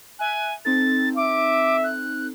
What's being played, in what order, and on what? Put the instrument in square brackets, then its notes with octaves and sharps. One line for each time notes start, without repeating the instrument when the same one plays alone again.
[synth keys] E5 F#6 [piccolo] G#5
[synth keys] C4 D#4 A4 [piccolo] A6
[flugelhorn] E5 [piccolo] D6
[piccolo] F#6